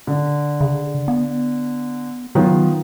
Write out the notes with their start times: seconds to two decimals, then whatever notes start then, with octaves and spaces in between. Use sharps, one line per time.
0.07 D3
0.61 C#3
1.08 B3
2.35 D#3 F#3 B3 F4